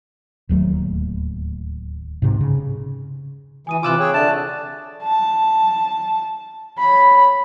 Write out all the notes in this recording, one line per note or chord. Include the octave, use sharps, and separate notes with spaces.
D1 D#2 F#3 A3
G#2 C3
C#3
E3 G#5 D#6 D#7
C3 E3 F4 D6 E6 F#6
G#4 C#5 G5
D3 D4 D5 E5 A5
A5
C#5 B5